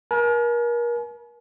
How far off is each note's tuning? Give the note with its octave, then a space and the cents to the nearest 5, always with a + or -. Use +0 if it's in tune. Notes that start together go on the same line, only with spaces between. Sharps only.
A#4 +35 G#5 +45